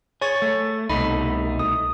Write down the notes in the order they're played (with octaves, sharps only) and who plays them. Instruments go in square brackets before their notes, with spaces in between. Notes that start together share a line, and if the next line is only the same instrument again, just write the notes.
[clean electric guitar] G#4 [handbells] C#5 C#6 A6
[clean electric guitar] A3
[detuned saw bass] C2 [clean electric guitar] B2 A3 D#4 [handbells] B5
[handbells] D#6